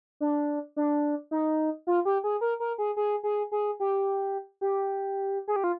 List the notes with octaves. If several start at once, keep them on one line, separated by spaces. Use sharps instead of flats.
D4
D4
D#4
F4
G4
G#4
A#4
A#4
G#4
G#4
G#4
G#4
G4
G4
G#4
G4
F4